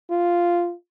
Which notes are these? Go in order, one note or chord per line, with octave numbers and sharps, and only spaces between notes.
F4